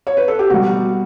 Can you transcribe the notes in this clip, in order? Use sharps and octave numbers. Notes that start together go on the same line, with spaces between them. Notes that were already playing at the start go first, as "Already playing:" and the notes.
C#5
B4
A4
G4
B2 G3 F#4